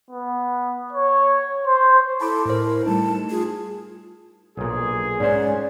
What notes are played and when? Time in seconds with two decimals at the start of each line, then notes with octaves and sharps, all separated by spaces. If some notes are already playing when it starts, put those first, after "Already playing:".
0.10 B3
0.93 C#5
1.67 C5
2.21 E4 A4 A5 B5 D6
2.46 A2 A#4 C5
2.86 G3 A3 D#4 A5
3.30 F4 G#4
4.57 B1 A#2 G#4
5.20 G#2 C#4 C5 D5